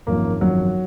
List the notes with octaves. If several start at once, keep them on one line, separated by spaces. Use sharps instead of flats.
G#1 F#2 F3 A#3
G#1 F#2 F3 F#3